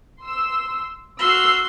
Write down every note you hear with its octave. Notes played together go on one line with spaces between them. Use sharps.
C6 E6
F#4 C6 E6 F6 C7